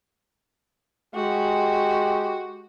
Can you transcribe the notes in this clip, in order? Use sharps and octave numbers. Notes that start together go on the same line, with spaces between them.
G#3 F#4 G4